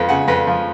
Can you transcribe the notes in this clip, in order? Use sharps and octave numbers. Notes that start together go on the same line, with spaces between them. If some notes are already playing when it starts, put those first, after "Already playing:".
Already playing: F2 F3 B4
C#3 F#5
F2 B4
F3